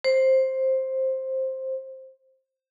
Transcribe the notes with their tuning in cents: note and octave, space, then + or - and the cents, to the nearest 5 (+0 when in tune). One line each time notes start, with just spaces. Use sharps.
C5 +10